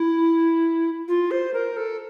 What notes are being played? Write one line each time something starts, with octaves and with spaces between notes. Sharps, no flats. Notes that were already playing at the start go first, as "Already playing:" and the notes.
Already playing: E4
F4
C5
A#4
A4